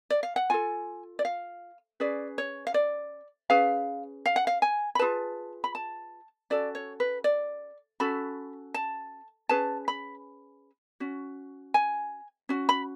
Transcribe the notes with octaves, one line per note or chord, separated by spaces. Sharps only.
D5
F5
F#5
F4 A4 G#5
D5
F5
C#4 G#4 B4 D5
C#5
F5
D5
C#4 G#4 B4 F5
F5
F#5
F5
G#5
B5
F4 G#4 B4 A5
B5
A5
C#4 F#4 A4 D5
C#5
B4
D5
C#4 F#4 A4 B5
A5
C#4 G#4 B4 A5
B5
C#4 F#4
G#5
C#4 F#4
B5